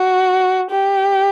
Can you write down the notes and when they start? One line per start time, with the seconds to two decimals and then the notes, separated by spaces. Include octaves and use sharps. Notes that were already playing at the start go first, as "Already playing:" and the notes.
Already playing: F#4
0.70 G4